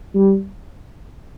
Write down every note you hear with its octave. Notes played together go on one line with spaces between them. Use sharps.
G3